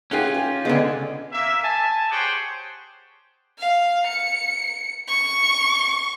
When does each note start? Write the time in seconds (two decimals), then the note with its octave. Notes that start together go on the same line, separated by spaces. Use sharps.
0.11 C#4 F4 G4 G#4 F#5
0.34 G4
0.65 D3 G#3 B3
1.32 A#3 E5
1.63 G#5 A5
2.10 G4 G#4 C5 C#5 F#5 G5
3.59 F5
4.07 C#7
5.08 C#6